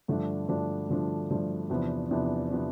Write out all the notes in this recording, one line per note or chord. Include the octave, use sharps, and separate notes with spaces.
G2 D3 F3 A3 D4
G2 D3 F3 A3 D4
G2 D3 F3 A3 D4
G2 D3 F3 A3 D4
E2 C3 F3 B3 D4
E2 C3 F3 B3 D4
C3 F3 B3 D4